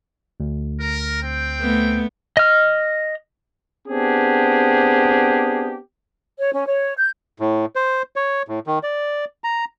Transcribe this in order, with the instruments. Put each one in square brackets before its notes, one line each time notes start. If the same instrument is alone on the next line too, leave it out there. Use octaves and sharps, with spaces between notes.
[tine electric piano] D2
[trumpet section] A#4
C4 G5
[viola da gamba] A3 B3
[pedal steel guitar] D#5 F6
[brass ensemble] B3 C4 D4 G4 G#4
[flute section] C#5
C#4
C#5
G6
[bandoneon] A2
C5
C#5
A2
D#3
D5
A#5